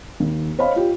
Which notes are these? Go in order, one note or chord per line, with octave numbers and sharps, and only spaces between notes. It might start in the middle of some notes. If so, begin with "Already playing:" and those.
D#2
C5 C#5 D#5 F5 B5
F4 G4